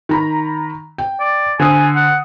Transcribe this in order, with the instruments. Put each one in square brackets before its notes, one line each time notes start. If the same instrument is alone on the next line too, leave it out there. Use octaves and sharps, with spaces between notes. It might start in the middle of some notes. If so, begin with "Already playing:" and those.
[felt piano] D#3 A#5 B5
G5
[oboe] D5
[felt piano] D3 C5 D#6 [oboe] G#5
[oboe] F#5